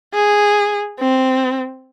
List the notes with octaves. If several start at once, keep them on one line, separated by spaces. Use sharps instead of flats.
G#4
C4